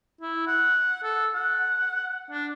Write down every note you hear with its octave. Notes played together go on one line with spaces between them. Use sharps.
E4
F#5
A4
F#5
D4